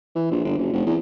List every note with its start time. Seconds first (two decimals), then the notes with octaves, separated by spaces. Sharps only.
0.15 E3
0.31 A#1
0.44 G1
0.58 F#1
0.73 F1
0.86 E2